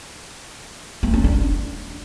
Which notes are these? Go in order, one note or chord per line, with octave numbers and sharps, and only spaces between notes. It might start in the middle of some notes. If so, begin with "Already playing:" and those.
B3
C#4
D4